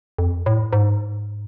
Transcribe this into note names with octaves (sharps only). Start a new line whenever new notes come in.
F2
A2
G#2